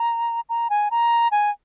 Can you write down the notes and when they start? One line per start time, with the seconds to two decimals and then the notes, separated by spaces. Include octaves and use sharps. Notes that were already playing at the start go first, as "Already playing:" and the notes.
Already playing: A#5
0.49 A#5
0.70 G#5
0.91 A#5
1.32 G#5